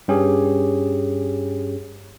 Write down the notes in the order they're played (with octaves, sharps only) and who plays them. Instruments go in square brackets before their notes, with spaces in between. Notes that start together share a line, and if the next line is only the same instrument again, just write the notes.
[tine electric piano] G2 C#4 G4 G#4